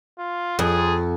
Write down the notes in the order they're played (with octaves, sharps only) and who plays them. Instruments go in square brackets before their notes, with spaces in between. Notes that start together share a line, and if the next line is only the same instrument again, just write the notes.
[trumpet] F4
[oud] F2 [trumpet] G#4